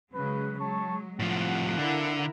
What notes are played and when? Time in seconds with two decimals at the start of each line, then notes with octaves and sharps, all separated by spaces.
0.14 C#3 F#3 G#3 B4
0.58 F#3 G#3 C#5 A5 C#6
1.20 A2 C3 F3 F5 F#5
1.77 D3 E4 A#4